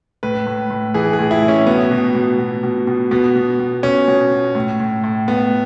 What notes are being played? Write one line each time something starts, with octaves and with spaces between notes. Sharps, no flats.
A2 B4
A2
A2
E3 G#4
G#4
A2
E4
A2
C#4
B2 B3
B2
B2
B2
B2
B2
B2 B3
B2
B2
B2 C#4
B2
B2
A2
A2
A2
A2 B3